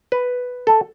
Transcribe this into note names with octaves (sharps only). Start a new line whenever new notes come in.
B4
A4